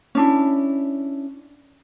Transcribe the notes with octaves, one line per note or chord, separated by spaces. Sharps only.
C#4 D4 E4